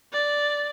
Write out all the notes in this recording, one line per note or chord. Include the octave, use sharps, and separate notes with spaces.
D5